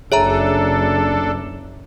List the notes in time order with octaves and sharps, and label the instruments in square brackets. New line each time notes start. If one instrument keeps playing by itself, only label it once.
[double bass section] F#1 [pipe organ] D4 A4 [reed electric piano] G#4 [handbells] C#5 E5 A#5